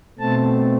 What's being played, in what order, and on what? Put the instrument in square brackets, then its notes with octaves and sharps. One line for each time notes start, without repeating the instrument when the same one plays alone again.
[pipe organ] B2 A3 C4 A5